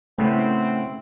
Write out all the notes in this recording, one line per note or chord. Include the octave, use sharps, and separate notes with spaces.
A2 C#3 A3 B3 C4 E4 F#5